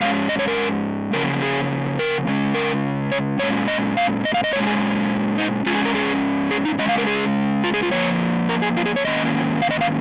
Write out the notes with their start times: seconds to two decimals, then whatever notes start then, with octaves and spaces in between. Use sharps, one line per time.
0.01 G#2 G#3 C#4 F5
0.29 D#5
0.39 C#5
0.48 A#4
1.13 C#3 F3 A#3 C#4 A#4
1.42 G#4
1.99 A#4
2.27 C#3 G#3 C#4
2.55 A#4
3.12 C#5
3.39 A#2 G#3 C#4 C#5
3.68 D#5
3.97 F5
4.25 D#5
4.34 F5
4.44 D#5
4.53 A#2 C#5
4.55 G#3 C#4
4.67 G#4
5.38 D#4
5.66 G#2 G#3 C#4 F4
5.75 G#4
5.85 A#4
5.95 G#4
6.51 G#4
6.65 D#4
6.79 C#3 G#3 C#4 D#5
6.89 F5
6.98 A#4
7.07 G#4
7.64 F4
7.74 G#4
7.83 F4
7.91 F2 F3 A#3 C#5
8.49 A#4
8.62 G#4
8.77 F4
8.86 G#4
8.96 C#5
9.04 G#2 D#3 A#3 C#4 D#5
9.62 F5
9.71 D#5
9.81 F5